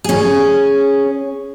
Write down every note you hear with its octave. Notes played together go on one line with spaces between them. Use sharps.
C#4 G#4